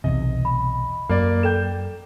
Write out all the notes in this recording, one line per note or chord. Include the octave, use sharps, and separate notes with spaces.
B1 E2 C3 D#5
B5
F#2 A#3 D5
A4 G5 G6 E7